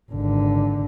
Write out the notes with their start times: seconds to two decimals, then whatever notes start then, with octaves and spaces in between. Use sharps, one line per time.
0.11 G#1 D3